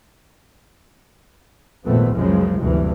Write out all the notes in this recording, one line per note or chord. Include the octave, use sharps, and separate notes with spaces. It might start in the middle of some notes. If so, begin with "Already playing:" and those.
G#1 F2 A#2 A3 B3 C4
F#1 C#2 F#2 C#3 F3 G#3
F#1 D2 G2 C3 E3